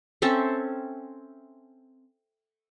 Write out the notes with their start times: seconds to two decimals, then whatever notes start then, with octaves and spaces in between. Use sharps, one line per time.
0.22 C4 C#4 A4 E5